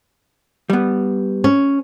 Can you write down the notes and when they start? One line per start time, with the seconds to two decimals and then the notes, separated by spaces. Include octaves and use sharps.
0.70 G3 B3
1.44 C#4